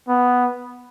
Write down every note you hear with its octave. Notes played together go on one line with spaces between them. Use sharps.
B3